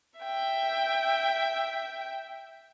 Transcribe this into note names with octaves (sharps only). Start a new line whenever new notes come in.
E5 G5